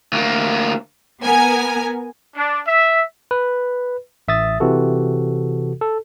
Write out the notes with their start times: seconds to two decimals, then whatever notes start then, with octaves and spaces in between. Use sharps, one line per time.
0.13 D2 A#3
1.24 B3 A#4 G#5
2.36 D4
2.67 E5
3.31 B4
4.28 A1 E5 D#6 A6
4.60 C3 E3 F#4 A4
5.81 A4